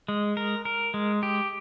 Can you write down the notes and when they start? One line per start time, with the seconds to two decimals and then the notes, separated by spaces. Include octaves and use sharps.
0.08 G#3
0.37 A#4
0.65 A#4
0.94 G#3
1.23 G4